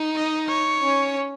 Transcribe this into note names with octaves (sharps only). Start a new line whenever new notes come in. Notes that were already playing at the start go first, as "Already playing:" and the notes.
Already playing: D#4
D#5
C#5
C#4